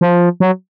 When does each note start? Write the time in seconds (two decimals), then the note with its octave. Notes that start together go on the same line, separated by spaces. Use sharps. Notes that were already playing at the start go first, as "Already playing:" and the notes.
0.01 F3
0.40 F#3